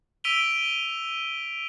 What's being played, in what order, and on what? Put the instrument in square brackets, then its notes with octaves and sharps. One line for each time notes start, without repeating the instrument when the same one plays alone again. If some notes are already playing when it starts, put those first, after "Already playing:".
[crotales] E6 B6 D7 D#7 F7 G7